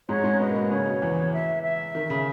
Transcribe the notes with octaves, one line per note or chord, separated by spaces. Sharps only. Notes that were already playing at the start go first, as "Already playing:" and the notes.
G#2 G#3 C#5
G#2 G#3
C#4
B2 B3 D#5
A#3
B2 B3
C#3 C#4 C#5
B2 B3
E2 E3
E5
E5
D#3
C#3